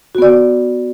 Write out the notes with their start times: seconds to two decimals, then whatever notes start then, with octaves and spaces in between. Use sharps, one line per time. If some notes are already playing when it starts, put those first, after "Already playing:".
0.15 F#4
0.18 B3
0.22 D5